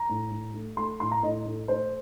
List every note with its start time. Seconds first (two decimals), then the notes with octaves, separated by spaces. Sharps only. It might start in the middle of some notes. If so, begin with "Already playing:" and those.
Already playing: A#5
0.09 A2
0.31 A2
0.54 A3
0.77 A3 C6
1.00 A2 C6
1.11 A#5
1.23 A2 D#5
1.46 A3
1.68 A3 C5